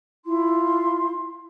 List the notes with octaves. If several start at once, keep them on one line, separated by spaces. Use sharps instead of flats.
E4 F4 C6